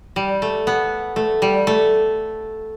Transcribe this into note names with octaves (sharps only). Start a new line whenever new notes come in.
G3
A3
B3
A3
G3
A3